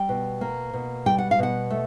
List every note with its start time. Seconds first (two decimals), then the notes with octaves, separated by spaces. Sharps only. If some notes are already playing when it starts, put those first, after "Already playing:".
Already playing: G3 G5
0.09 B2
0.41 A#3
0.73 B2
1.06 G3 G5
1.18 F#5
1.31 F5
1.39 B2 F#5
1.70 A3